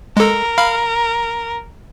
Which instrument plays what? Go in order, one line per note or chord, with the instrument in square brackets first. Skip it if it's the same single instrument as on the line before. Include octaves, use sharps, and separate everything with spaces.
[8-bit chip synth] G#3 A4 [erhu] A#4
[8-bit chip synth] F5 B5 F6